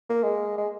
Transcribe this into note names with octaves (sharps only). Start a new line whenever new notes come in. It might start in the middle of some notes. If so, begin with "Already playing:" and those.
A#3
G#3
G#3